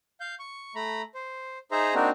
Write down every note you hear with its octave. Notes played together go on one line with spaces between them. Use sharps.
F5 G6
C#6
A3 A#5 B5
C5
D#4 G#4 C5 E5 A#5
A#3 C4 D4 D#4 F#4